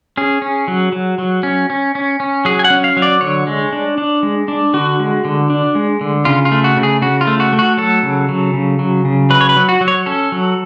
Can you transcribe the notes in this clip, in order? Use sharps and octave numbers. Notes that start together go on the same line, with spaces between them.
C#4 G#4
C#4
F#3
F#3
F#3
C#4
C#4
C#4
C#4
F#3 G#4
G#5
F#5
C#4
F5
F#3
D5
D3 C#5
G#3
D4
D4
G#3
D4
D3 F#4
G#3
D3
D4
G#3
D3
C#3 F4
F4
A3
F#4
C#3
G#4
C#3 F#4
F4
A3
F#4
A3
F#4
F#3 A4
C#3
F#3
C#3
F#3
C#3
F#3 B4
C#5
B4
F#3
F#4
F#3
C#5
C#4 A4
F#3